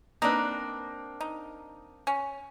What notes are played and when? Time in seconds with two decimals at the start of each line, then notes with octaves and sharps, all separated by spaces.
0.22 A#3 C4 D4 D#4 B4
1.21 D#4
2.07 C#4